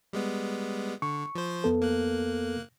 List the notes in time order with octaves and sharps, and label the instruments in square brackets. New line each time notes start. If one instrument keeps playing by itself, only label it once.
[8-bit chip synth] G3 G#3 B3
[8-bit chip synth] D3 [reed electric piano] C#6
[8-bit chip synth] F3 C5
[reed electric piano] F2 B3 A4
[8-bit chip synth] A#3 F#6